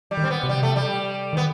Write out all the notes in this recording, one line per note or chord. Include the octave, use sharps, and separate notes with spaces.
G3
D#3
C4
B3
C3
G3
A3
G3
D#3 B3